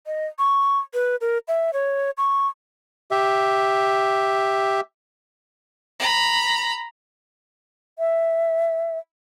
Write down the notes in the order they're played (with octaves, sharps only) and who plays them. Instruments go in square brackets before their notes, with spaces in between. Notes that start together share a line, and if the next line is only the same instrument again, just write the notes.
[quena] D#5
C#6
B4
A#4
E5
C#5
C#6
[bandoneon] G4 E5
[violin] A#5 B5
[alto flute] E5